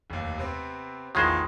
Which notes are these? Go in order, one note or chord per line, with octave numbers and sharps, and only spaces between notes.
F1 D#2
C3 B3 C4
A1 E2 D#3 G#3 F4 C5